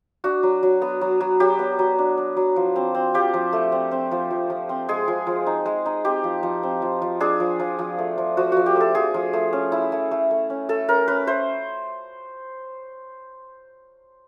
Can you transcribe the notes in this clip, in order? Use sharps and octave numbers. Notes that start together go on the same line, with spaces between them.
D4 F#4
F#3
F#3
B3
F#3
F#3
F#3 G4
B3
F#3
D4
D4
F#3
F3
C4
C4
F3 G4
F3
A3
C4
C4
F3
F3
F3
C4
G#3 G#4
F3
F3
D#4
G#3
D#4
C4 G4
F3
F3
C4
F3
F3
D4 G#4
F3
F3
F3
A3
F3
F3 F#4
F3 F#4
G4
A3 A4
F3 G#4
F3
A3
C#4
E4
A3
A3
A3
C#4
A3 A4
C#4 A#4
C#4 B4
A3 C5